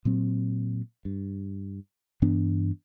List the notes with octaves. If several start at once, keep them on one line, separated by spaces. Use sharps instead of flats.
A#2 F#3 C4
G2
G2 E3 B3 D4